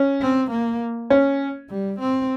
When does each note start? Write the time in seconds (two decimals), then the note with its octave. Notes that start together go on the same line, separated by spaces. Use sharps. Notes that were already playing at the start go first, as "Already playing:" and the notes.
Already playing: C#4
0.21 C4
0.51 A#3
1.10 C#4
1.69 G3
2.00 C4